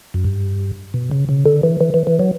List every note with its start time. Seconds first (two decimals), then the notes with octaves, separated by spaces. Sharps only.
0.14 F#2
0.24 G2
0.94 B2
1.11 C#3
1.29 C#3
1.46 D3
1.63 E3
1.81 E3
1.94 E3
2.07 E3
2.19 F#3